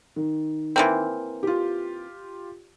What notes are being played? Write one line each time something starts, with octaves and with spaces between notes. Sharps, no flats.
D#3
E3 A#3 C4
F4 G4